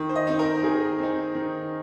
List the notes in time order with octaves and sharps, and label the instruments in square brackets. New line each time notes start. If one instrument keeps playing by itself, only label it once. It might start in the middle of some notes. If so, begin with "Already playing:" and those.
Already playing: [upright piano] D#3
C5
D#5
C4 D#4
A#4
D#3 G#4
C4 D#4
D#3